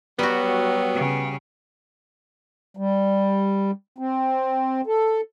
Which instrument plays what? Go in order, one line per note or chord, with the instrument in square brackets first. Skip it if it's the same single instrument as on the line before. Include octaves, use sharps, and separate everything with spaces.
[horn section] F#3 [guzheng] G3 F#4 [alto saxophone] B3
[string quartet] C#3
[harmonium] G3
C4
A4